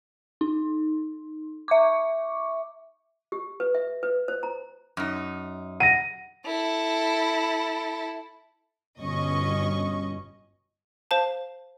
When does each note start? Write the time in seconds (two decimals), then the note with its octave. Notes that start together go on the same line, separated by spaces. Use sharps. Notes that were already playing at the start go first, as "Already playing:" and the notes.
0.41 D#4
1.68 E5 C#6 D6
3.32 G4
3.60 B4
3.75 E5
4.03 B4
4.28 C5
4.43 A#5
4.97 F#2 D#4
5.80 F#5 A#6 D#7
6.46 E4 A4
9.01 G1 G2 B2 C#4 D#5 C#6
11.11 C5 F5 A5